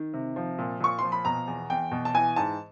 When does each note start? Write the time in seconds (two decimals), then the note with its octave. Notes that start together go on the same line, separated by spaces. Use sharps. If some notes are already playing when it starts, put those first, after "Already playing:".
Already playing: D#3
0.13 C3
0.36 F3
0.59 A#2
0.80 A#2 C#6
0.99 F3 C6
1.12 B5
1.25 B2 A#5
1.47 E2
1.70 E2 G5
1.92 B2
2.05 A5
2.14 E3 G#5
2.36 G#2 A5